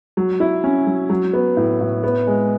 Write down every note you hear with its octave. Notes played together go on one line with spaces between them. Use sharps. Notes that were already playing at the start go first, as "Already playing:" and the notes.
F#3
E4
C#4
F#3
F#3
B3
A2
A2
B3
G#3